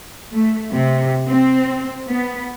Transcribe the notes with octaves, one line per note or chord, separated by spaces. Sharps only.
A3
C3
C4
B3